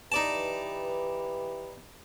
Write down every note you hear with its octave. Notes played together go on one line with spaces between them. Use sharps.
E3 D#4 G4 B4 D5 A5